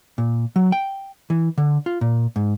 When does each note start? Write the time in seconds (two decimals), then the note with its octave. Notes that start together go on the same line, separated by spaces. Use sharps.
0.18 A#2
0.56 F#3
0.72 G5
1.30 E3
1.58 D3
1.86 F4
2.01 A#2
2.36 G#2